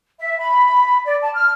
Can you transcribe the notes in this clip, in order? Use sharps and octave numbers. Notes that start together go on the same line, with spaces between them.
E5
B5
D5
A5
F6